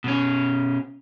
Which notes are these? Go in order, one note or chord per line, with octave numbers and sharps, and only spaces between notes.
B2 C#4